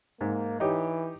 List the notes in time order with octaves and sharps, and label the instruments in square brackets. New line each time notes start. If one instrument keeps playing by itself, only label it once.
[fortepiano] G#2 [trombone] A#3
[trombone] E3 [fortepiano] D#4 G4 C#5